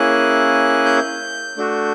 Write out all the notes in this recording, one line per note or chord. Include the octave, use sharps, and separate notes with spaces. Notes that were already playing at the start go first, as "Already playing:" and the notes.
Already playing: A#3 C#4 E4 G#4 F#6
G6
A3 D4 F#4